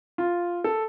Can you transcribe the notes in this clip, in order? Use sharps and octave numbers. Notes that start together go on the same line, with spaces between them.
F4
A4